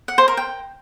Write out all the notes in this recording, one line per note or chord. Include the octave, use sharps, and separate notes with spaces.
F#5
C5
A#4
G5